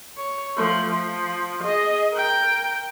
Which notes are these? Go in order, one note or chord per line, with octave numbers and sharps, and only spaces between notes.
C#5
F3 A3
F3
G#4 D#5
A#4 G5